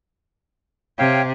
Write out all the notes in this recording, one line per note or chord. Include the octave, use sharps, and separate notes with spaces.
C3 C#5 F5 G5